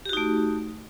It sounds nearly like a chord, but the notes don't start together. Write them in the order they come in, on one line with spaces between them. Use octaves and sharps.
G4 F#4 D#4 A3